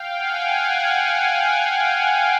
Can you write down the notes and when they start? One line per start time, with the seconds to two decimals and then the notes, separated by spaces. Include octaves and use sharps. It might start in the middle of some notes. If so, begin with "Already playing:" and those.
Already playing: F5 G5
0.13 F#5 G#5